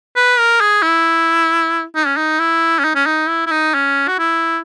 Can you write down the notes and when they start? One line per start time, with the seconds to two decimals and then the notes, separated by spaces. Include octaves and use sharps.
0.16 B4
0.38 A#4
0.61 G#4
0.83 E4
1.95 D#4
2.06 C#4
2.17 D#4
2.40 E4
2.79 C#4
2.84 D#4
2.95 C#4
3.06 D#4
3.29 E4
3.46 E4
3.51 D#4
3.74 C#4
4.08 F#4
4.19 E4